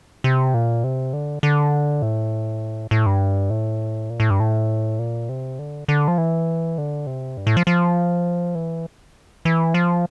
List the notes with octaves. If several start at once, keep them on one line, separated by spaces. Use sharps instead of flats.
C3
A#2
C3
D3
D3
A2
A2
G2
A2
A#2
A2
G2
A2
A#2
C3
D3
D3
F3
E3
D3
C3
G2
A2
F3
F3
E3
E3
F3